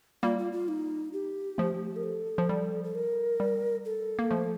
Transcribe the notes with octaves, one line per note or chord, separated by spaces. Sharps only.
G3 A#3 F4
F4
F4
D#4
G4
F3 A3
A#4
A4
F3
G3
A4
A#4
G3
A4
A#3
F3 A3